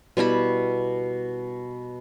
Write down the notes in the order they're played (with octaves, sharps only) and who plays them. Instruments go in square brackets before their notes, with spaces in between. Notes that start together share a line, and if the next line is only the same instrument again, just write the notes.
[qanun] B2 G3 E4 B5